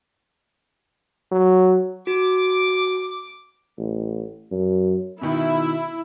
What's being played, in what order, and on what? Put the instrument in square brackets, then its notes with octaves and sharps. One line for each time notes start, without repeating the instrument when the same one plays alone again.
[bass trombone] F#3
[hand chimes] F#4 [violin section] D6
[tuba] A1
F#2
[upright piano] B2 D#3 [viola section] E4